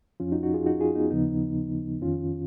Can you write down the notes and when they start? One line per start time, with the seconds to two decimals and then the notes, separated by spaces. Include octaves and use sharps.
0.20 F2 F3 C#4 F4
0.32 D#4 F#4
0.43 D#4 F#4
0.54 F4 G#4
0.66 D#4 F#4
0.80 F4 G#4
0.96 B3 D#4
1.11 D#2 C#3 F3 B3 D#4
2.01 F2 D#3 C#4 F4